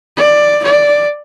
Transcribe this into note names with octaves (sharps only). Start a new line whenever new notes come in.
D5
D5